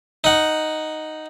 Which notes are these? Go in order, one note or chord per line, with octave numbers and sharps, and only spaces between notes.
D#4 F#5